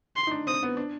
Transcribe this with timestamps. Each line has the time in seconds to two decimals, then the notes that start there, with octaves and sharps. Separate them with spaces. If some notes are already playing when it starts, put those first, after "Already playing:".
0.16 C6
0.27 D#4
0.31 D4
0.47 C4 D#6
0.63 B3
0.77 D4